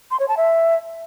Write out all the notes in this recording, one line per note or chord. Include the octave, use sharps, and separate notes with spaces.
C6
C#5
A5
E5